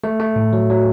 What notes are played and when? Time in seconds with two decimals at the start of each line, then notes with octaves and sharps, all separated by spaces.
0.04 A3
0.20 A3
0.36 A2
0.53 F#3
0.70 F#3